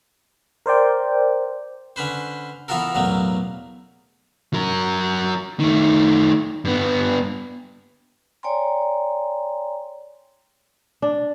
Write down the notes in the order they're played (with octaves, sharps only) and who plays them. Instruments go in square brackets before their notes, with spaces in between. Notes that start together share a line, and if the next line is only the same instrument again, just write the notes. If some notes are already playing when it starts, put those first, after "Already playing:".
[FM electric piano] A#4 C5 D5 G5
[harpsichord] D3 C#4 B4 C5
E3 B3 F4 F#4 A4 A#4
A1 E2 B2 F#3 A3 A#3
[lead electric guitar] F#3 A#4
D#3 A3
G2 B3
[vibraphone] C#5 D5 G5 G#5 A#5 C6
[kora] D4